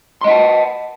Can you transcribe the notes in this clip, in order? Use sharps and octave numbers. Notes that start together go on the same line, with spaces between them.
D#5 F#5 A5 C6